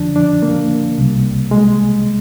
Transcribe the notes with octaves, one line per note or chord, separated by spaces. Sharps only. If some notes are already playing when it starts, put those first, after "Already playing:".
Already playing: F2 D3 F3 D4
D4
A#3
C2 C3 G3
G#3